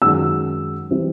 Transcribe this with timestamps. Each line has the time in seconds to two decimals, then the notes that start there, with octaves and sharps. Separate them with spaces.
0.02 F#2 D#3 G#3 E6
0.91 E3 G3 C4